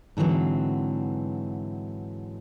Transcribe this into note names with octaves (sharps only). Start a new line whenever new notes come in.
G#2 D3 E3 F#3 C4